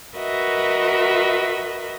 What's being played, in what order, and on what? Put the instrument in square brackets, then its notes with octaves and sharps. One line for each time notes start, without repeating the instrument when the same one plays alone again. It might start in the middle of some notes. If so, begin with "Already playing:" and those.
[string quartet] F#4 A#4 B4 D#5 E5